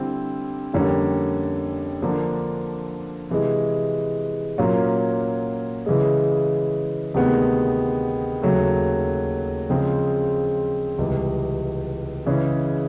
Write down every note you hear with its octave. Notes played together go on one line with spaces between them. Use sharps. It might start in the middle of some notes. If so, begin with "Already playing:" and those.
Already playing: D3 G3 C4 E4
F2 D3 G3 A#3 C#4
D3 F3 A#3 D4
C3 E3 G#3
A#2 F#3 A#3 C#4 F4
C#3 E3 G#3
D2 C3 D#3 G#3 B3
D#2 C#3 F#3 A3
C#3 F3 G#3 C4
C#2 C3 E3 G3
C#3 E3 G#3 C#4